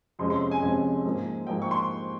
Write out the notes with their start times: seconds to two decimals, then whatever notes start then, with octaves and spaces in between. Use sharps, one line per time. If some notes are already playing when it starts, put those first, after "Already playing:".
0.19 F2 C3 F3 G#3 C#4 C6
0.30 C6
0.51 G#5
0.62 F2 C3 F3 G#3 C#4 G#5
1.05 G#2 F3 A#3
1.47 G#2 F3 A#3 G5
1.62 C#6
1.71 C6